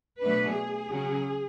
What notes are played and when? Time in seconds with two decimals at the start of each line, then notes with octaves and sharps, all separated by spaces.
0.22 B2 F#3 A3 D4 B4
0.56 G#4
0.90 C#3 F#3 C#4